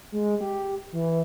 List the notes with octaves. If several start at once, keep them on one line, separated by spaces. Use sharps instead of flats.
G#3
G4
E3